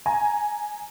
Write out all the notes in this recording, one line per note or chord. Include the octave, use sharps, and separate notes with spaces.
G#5 A#5